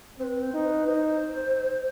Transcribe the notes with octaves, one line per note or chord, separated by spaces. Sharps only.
C4 B4 C5
C5
D#4
B4
D#4 C5